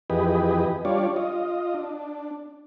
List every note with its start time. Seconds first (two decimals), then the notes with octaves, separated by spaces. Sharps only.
0.10 F2 E3 G4 G#4 B4 D#5
0.85 G3 D4 F4 C#5 D5
1.16 F4 D#5
1.74 D4